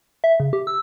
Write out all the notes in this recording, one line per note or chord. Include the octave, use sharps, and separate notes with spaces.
E5
C#3
G4
E6